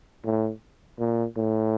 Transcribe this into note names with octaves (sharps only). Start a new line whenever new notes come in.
A2
A#2
A2